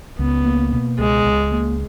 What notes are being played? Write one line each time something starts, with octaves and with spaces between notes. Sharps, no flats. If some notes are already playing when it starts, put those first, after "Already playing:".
C#2 B3
A#3
B2
C#2 G#3
C#2
A#3